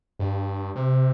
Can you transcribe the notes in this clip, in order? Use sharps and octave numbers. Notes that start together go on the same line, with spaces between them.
G2
C3